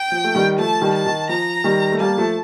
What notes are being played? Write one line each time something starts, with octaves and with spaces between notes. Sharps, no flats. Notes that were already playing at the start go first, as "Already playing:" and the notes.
Already playing: G5
F3
A3
D#3 G3
F3 A3 A5
D#3 G3
A5
D#3
F3 A#5
D#3 G3
A3
G3 A#3 A5
F3 A3